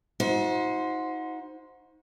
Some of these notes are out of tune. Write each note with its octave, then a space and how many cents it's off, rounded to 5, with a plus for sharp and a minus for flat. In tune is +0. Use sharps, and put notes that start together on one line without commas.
D#4 +35 F#4 -25 C5 +0